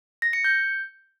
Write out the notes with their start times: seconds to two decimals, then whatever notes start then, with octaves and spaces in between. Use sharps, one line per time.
0.22 A#6
0.33 C#7
0.44 G6